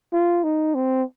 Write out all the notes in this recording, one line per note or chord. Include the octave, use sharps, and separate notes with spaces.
F4
D#4
C4